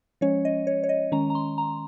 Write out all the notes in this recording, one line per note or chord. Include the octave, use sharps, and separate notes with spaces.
F3 G#3 C#4 C#5
D#5
C#5
C#5
D#5
D#3 G#3 C#4 A#5
A#5
C6
A#5